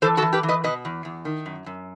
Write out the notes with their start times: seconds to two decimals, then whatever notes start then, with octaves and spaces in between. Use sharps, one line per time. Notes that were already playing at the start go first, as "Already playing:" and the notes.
0.02 E3 A4 C5
0.17 F#4 A4
0.22 E3
0.33 G4 B4
0.43 E3
0.49 B4 D#5
0.64 B2 B4 D#5
0.85 E2
1.05 E2
1.25 D#3
1.46 F#2
1.66 F#2